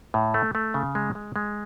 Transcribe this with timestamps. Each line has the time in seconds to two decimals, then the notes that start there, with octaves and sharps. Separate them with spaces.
0.14 A2
0.34 A3
0.55 A3
0.74 C#3
0.95 G#3
1.15 G#3
1.36 G#3